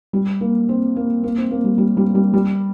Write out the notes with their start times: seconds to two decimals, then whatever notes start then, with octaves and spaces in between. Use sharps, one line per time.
0.13 G3
0.41 A#3
0.69 C4
0.96 A#3
1.24 A#3
1.38 C4
1.51 A#3
1.64 G3
1.78 G3
1.97 G3
2.15 G3
2.33 G3